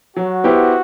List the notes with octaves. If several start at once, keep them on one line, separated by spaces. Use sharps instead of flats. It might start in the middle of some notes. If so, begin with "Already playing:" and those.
F#3 F#4
B3 E4 G4 C5